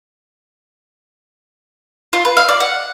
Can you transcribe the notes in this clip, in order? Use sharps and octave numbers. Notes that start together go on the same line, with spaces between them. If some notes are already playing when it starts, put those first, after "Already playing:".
F4
B4
F5
D5
F#5